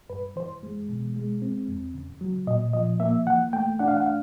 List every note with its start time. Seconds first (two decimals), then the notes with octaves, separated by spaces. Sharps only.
0.10 G2 B4
0.36 E3 C5
0.63 G#3
0.89 B2
1.16 G#3
1.42 C4
1.68 E2
1.94 C#3
2.21 F#3
2.47 A#2 D#5
2.73 F3 D#5
3.00 A#3 E5
3.27 E3 F#5
3.53 A3 G5
3.79 D4 F#5
3.88 F5
3.97 F#5
4.06 F5